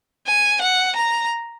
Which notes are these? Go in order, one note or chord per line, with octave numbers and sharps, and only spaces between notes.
G#5
F#5
A#5